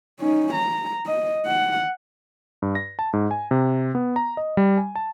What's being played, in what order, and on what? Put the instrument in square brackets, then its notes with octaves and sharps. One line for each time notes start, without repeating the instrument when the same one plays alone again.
[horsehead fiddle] C#4 D#4
A#5
D#5
F#5
[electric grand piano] G2
A#6
A5
G#2
G#5
C3
B3
A#5
D#5
G3
G#5
A5